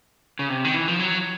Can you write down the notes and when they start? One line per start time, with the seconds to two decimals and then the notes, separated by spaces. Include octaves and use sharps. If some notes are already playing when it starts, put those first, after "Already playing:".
0.39 C#3
0.49 C3
0.64 D#3
0.74 E3
0.88 F3
0.99 F#3